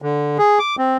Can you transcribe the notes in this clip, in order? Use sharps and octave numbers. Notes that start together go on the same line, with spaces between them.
D3
G#4
D6
C4